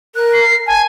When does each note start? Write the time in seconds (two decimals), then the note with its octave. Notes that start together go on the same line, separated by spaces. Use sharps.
0.15 A#4 F#6
0.33 C7
0.67 G#5 A5